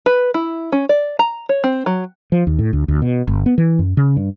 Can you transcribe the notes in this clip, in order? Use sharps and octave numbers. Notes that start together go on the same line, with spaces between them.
B4
E4
C#4
D5
A#5
C#5
C4
F#3
F3
D#2
A2
D2
D2
B2
G1
B3
E3
F#2
C#3
G2